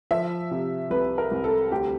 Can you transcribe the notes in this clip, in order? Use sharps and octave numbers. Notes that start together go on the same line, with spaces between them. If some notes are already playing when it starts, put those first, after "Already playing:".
F3 E5
C3
C2 B4
A#4
C2
A4
D2 G4